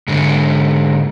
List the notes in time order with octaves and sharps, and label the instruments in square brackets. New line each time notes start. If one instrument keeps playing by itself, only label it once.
[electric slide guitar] G#2 D3 G#3